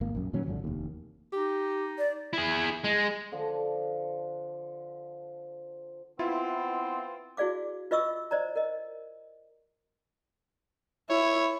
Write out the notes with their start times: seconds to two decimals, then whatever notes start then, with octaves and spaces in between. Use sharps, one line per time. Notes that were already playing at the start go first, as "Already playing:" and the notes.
0.01 G#1 A#3
0.15 A#1 F#2
0.33 A#2 D#3 F#3 C#4
0.46 G#1 C#2 F#2 D3
0.64 F1 D#2
1.33 D#4 G4
1.98 D5
2.33 E4 G#4
2.84 G#3
3.32 D3 F3
6.19 B3 C4 E4 F4
7.37 E4 F#4 G#4 D5 F5 D6
7.91 F4 B4 D#5 E5 C#6 E6
8.31 C5 D5 D#5 A#5
8.56 A#4 D#5
11.10 E4 C#5